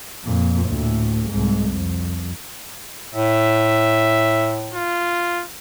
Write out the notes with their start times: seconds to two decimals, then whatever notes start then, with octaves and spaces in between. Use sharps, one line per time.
0.24 F2 A#2
0.68 D2 A2
1.30 C2 G#2
1.71 F2
3.14 A2 E5
4.74 F4